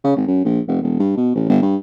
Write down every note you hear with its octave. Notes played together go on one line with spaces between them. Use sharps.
C#3
G#1
F#2
A#1
F1
E1
G2
B2
A1
G1
G2